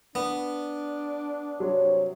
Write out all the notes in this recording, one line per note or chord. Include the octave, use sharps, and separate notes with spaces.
B3 D4
G2 C3 F#3 C5 C#5